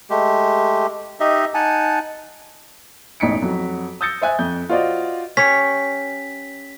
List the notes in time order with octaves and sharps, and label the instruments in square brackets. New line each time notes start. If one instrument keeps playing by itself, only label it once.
[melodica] G#3 A3 G4
D#4 G4 D#5 E5
D#4 F#5 G#5 A5
[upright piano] E1 A1 D#4 B6 C#7 D7
F2 F#3 F#4
D#6 E6 G6 A6 A#6 C#7
C5 E5 G#5 F#6
F2 G6
F4 F#4 C5 D5 D#5 F5
[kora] C#4 G4 C#5 [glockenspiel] B6